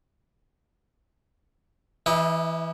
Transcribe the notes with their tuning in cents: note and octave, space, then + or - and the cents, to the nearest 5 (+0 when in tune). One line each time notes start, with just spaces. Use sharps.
E3 +0 E4 -35 D#5 -30